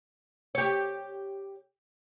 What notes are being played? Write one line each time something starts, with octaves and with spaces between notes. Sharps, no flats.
G4 C#5